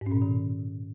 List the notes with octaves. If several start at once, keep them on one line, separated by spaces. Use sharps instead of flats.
G#2
C#4
A#2
B2
D#3